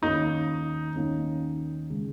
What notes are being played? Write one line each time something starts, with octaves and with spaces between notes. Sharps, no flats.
D#2 D#3 A#3 C#4 D#4
D#2 D#3 A#3 C#4
C#3 G#3